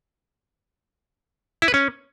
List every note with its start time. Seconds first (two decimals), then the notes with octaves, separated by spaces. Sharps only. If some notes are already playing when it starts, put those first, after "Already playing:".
1.62 E4
1.68 B4
1.74 C#4